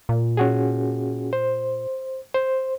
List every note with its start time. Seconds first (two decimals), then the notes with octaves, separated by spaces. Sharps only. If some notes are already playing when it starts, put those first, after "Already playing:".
0.09 A#2
0.37 C#4 F#4 G#4
1.33 C5
2.35 C5